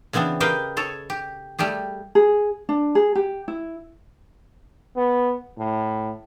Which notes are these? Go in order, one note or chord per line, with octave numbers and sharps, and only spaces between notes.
C#3 E3 B3 C4 D4
G4 A#4 B4 D#5 F5 G5
G#4 A4 C#5
G4
G3 A3 G4 G#4
G#4
D4
G#4
G4
E4
B3
A2